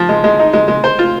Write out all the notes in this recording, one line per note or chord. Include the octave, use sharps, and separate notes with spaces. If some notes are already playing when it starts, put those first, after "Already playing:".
Already playing: F3
G#3
G#3
D#4
G#3
G#3
C5
F4